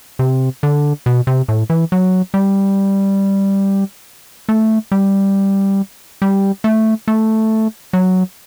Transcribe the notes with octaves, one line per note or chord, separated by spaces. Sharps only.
C3
D3
B2
C3
A2
E3
F#3
G3
A3
G3
G3
A3
A3
F#3